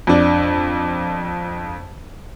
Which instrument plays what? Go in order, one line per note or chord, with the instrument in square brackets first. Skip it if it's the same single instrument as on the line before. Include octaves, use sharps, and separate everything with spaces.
[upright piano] F2 D4